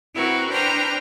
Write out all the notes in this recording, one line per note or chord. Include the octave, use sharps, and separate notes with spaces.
C4 E4 F#4 A#4 B4
D4 B4 C5 G5 A#5 F6